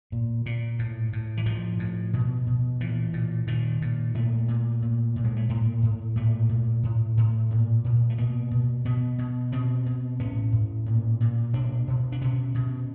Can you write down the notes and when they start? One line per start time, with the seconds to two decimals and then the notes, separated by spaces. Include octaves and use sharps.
0.12 A#2
0.46 A#2
0.79 A2
1.13 A2
1.37 E3
1.46 A2 F3
1.79 A2
2.13 B2
2.47 B2
2.80 A#2 E3
3.13 A#2
3.47 A#2 D#3
3.82 A#2
4.15 A#2 A3
4.48 A#2
4.82 A#2
5.16 A#2
5.24 G#3
5.37 A3
5.49 A2 A#3
5.83 A2
6.16 A#2 A3
6.49 A#2
6.83 A2
7.17 A2
7.51 A#2
7.84 A#2
8.10 A3
8.18 B2 A#3
8.51 B2
8.85 B2 B3
9.18 B2
9.52 B2 C4
9.86 B2
10.20 A2 C#4
10.52 A2
10.86 A#2
11.20 A#2
11.53 B2 D4
11.88 B2
12.12 D4
12.21 B2 C#4
12.55 B2